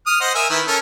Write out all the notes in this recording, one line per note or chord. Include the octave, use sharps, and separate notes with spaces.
D#6 F6
C5 D#5 F#5
A#4 E5 G#5
D#3 E4 B4
C#4 A4 A#4